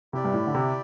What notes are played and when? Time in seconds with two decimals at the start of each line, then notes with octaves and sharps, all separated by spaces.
0.13 C3 E4 G4 D5
0.24 G2
0.34 A2
0.47 D3
0.55 C3